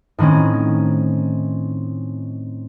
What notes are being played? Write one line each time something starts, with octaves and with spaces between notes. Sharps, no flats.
A2 D#3 C4 C#4